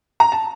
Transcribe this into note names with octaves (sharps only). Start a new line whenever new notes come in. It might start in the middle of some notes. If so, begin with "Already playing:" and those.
A#5
A5